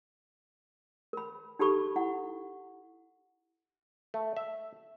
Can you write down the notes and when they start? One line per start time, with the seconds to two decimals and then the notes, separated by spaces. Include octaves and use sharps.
1.13 A#4 B5
1.59 D#4 G4 A4 B5 C#6
1.96 E4 F#5
4.14 A3
4.37 E5